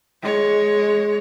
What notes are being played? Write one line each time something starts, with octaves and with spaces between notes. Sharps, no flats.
G#3 C#5